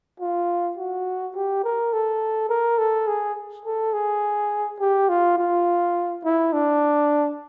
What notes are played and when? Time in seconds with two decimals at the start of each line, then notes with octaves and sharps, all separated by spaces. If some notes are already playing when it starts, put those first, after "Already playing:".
0.20 F4
0.77 F#4
1.35 G4
1.63 A#4
1.93 A4
2.49 A#4
2.78 A4
3.07 G#4
3.65 A4
3.93 G#4
4.80 G4
5.09 F4
5.37 F4
6.24 E4
6.53 D4